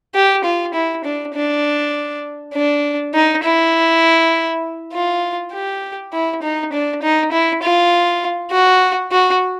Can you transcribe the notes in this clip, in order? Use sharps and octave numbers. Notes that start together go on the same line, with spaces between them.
G4
F4
E4
D4
D4
D4
D#4
E4
F4
G4
E4
D#4
D4
D#4
E4
F4
F#4
F#4